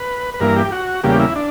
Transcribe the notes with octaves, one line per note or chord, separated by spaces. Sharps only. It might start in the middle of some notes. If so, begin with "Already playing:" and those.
Already playing: B4
B4
G2 E3 A#3 A#4
G4
F#4
E2 C#3 G3 A#3 G4
E4
D4